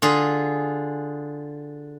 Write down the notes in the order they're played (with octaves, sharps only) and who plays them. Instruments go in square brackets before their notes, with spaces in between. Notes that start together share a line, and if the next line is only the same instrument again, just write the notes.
[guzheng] D3 F4 G#4